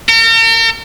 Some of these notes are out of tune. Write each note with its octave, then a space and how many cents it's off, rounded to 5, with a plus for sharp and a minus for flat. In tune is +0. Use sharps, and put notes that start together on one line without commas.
A#4 -40